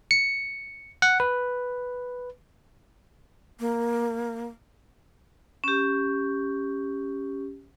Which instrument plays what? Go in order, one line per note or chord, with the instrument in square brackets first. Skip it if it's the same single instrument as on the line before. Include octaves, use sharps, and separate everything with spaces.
[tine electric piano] C#7
F#5
B4
[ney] A#3
[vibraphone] C#4 G4